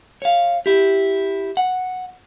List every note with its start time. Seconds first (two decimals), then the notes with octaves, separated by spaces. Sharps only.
0.22 C#5 F5
0.66 E4 G4
1.57 F#5